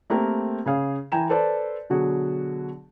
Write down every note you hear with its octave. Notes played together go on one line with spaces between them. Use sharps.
A3 A#3 C4 G4 A#4
C#3 G#4 F5
E3 G5 G#5 A#5 E7
A4 B4 C5 D5 A5
B2 D3 F#3 F#4 G#4